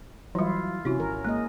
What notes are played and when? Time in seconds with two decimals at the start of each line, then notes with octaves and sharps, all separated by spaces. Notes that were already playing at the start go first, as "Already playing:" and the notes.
0.35 E3 F#3 G3 E4 F4
0.85 C3 C#4 E4 F#4
1.00 G#1 A#4
1.25 G#3 A#3 D#5